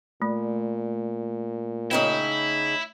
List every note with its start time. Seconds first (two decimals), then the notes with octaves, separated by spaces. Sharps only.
0.22 A#2 A3
1.91 C#3 D#4 E4 G5